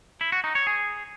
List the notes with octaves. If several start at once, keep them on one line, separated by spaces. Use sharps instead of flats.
E4
F#4
D#4
C#5
G#4